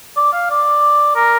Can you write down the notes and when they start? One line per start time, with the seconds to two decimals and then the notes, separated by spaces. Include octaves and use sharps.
0.16 D5
0.33 F5
0.50 D5
1.15 A#4